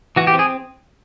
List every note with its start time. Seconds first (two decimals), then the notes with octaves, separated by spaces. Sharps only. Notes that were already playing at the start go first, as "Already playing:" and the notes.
0.16 E3 F#4
0.27 G4
0.34 C4
0.39 G#4